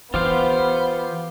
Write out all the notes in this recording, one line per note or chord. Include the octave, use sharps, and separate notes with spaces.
E3 B3 F4 G4 C5 F5